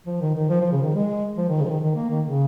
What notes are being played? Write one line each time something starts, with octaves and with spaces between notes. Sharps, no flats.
F3
D#3
D#3
F3
F3
C#3
D#3
G#3
F3
D#3
C#3
F3
D#3
D#3
A#3
D#3
C#3